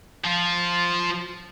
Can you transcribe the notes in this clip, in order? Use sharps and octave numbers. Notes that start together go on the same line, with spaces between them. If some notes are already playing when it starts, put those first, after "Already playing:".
F3 F4